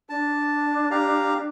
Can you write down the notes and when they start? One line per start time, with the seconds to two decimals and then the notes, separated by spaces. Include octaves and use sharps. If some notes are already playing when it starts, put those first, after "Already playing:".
0.09 D4 A5
0.91 G4 F5 A#5